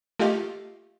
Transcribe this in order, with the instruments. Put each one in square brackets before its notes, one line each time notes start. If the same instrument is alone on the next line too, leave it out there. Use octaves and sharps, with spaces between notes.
[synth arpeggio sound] A3 F4 G4 D#5 F5